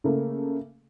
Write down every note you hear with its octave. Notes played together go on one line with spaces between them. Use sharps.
C#3 A3 A#3